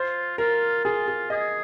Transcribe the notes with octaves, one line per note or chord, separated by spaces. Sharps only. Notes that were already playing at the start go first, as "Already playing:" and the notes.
Already playing: F4 C5
F4 A#4
F4 G#4
G#4
G#4 D#5